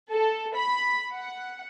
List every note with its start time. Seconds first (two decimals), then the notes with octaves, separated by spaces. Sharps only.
0.11 A4
0.56 B5
1.13 F#5